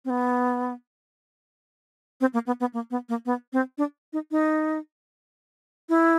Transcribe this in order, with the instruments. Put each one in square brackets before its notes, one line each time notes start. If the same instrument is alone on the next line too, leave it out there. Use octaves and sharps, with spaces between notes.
[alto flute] C4
B3
C4
A#3
B3
B3
A#3
B3
A#3
B3
C4
D4
D#4
D#4
E4